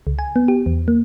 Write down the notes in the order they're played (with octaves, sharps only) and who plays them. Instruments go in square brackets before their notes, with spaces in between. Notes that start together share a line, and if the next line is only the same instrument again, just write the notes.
[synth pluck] C#2
G#5
B3
G4
E2
A#3